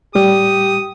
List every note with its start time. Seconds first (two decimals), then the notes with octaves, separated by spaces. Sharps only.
0.15 A2 G3 G4 D#6